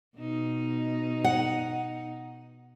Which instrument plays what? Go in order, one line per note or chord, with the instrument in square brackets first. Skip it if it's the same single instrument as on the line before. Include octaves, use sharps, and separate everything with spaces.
[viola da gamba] B2 D#4
[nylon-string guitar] F#5